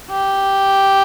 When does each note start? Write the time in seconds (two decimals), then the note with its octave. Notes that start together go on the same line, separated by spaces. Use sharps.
0.10 G4